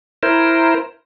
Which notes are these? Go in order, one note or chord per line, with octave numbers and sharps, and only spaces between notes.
E4 A#4 C5